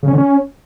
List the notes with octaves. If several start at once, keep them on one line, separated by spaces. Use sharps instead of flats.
C#3
C#4
D3
C#4